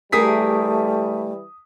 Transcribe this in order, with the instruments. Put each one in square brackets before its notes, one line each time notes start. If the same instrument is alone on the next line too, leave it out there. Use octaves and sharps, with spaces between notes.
[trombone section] E3 G3 [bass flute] A3 [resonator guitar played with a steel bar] G4 G#4 A#4 [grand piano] D#6 B6